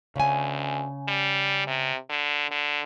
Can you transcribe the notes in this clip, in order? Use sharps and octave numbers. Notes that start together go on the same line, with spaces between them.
D2 C#3 G#5
G3
C3
D3
D3